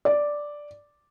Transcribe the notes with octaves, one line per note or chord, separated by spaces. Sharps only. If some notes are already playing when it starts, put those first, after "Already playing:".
D5